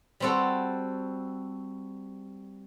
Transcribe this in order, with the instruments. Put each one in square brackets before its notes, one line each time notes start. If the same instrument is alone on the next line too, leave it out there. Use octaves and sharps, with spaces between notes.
[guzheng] G3 C4 F#4 A4